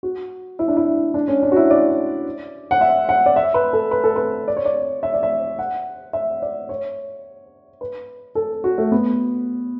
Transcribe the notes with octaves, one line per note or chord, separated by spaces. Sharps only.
F#4
E4
D4
E4
D4
C#4
D4
F#4
E4
D5
F#5
E5
F#5
D5
E5
B4
A4
B4
A4
B4
D5
C#5
D5
E5
D5
E5
F#5
E5
D5
C#5
B4
A4
F#4
A3
B3